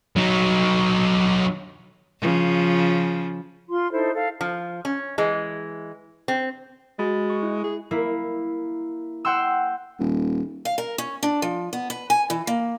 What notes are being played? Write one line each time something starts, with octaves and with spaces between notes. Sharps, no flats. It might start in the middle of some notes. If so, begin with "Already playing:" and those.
F#3 D#4
C#3 F3
F4 C6
D#4 E4 A4 C5
A4 F5
F3
C#4
E3 G#3
C4
G#3 F#4 B5 A6
C#6
E4
G#4
A#3 E4
F#5 G5 C6 E6
D#1
F5
A#4
C#4
D4
F3
B3
B4
G#5
E3
A#3